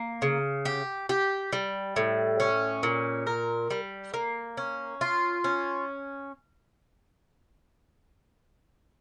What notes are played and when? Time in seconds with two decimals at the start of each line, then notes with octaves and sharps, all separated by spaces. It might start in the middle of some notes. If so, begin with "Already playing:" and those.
Already playing: A#3
0.22 C#3
0.65 G4
1.09 G4
1.53 G3
1.96 A2
2.40 C#4
2.83 A#2
3.27 A#4
3.70 G3
4.14 A#3
4.57 C#4
5.01 F4
5.44 C#4